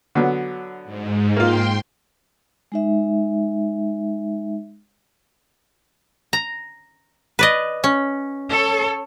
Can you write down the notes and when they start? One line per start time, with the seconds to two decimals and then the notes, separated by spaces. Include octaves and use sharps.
0.15 D3 F#3 B3
0.85 G#2
1.36 A#3 F4 G5 C6
2.72 G#3 D#4 E5
6.33 A#5
7.39 B4 D5 D#5
7.84 C#4
8.49 A4 C#5